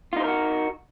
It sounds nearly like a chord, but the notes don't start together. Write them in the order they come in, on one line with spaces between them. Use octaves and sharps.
F4 D#4 C5 A#4 F#4